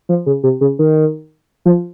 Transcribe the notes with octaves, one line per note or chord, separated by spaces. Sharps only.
F3
C#3
C3
C#3
D#3
F3